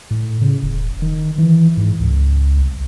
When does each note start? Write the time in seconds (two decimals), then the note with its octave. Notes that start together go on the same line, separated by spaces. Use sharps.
0.11 A2
0.41 C#3
0.63 E1
1.02 D#3
1.38 E3
1.77 G#2
2.00 C#2
2.57 C2